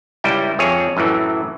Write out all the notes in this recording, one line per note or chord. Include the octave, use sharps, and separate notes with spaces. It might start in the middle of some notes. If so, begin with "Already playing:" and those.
C#2 G3 E4 G5
F2 G#4 C#5
F#2 A2 E3